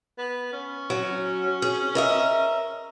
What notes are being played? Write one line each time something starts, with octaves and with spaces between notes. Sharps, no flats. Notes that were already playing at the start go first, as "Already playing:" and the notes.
B3
C#4
F#3
G#4
A#4 D#5 E5